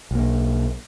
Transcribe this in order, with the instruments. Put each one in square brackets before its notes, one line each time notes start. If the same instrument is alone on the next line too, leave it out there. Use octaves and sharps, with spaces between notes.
[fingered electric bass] B1 A#3